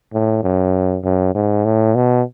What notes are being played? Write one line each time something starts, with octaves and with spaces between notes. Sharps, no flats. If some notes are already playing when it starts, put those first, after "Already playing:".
A2
F#2
F#2
G#2
A2
B2